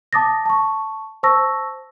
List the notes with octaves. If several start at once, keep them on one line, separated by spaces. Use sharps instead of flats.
A5 D6 D#6 A6 A#6
A5 C#6
C5 A5 C#6 E6 A#6